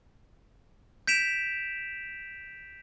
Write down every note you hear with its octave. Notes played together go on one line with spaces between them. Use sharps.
G6 B6 D7 E7 F7